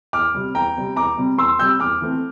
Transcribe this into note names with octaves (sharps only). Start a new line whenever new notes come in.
E2 D6 F6
C3 G3 C4
E2 G5 A#5
C3 G3 C4
E2 A#5 D6
C3 G3 C4
E2 C6 E6
C3 G3 C4 E6 G6
E2 D6 F6
E3 A3 C4